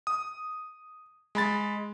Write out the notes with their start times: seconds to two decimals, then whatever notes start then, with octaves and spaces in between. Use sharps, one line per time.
0.07 D#6
1.35 G#3 B5 A6